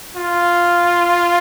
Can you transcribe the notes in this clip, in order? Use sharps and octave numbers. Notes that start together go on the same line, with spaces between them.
F4